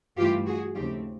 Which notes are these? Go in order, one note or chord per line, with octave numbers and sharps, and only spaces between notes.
G2 E3 A3 F4 G4
F#4 G#4
D#2 C#3 F3 A3 C4 F4 G4